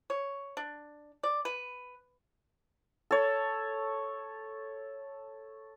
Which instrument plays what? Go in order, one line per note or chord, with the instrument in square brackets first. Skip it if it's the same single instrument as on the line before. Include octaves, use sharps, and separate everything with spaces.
[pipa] C#5
D4
D5
B4
[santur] A4 C#5